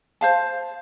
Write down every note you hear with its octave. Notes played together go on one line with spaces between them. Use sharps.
C5 F5 A5